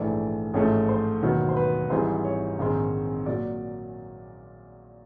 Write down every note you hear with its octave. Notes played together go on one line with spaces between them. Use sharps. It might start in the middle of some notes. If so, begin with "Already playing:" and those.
Already playing: A#1 G#2 E3 A3 D5
A1 G#2 F3 A3 C#5
C5
E1 D#2 D#3 F#3 B3
C5
B4
G#1 G#2 E3 G3 C5
C#5
A#1 G#2 D#3 G#3 C4
A#2 F#3 D5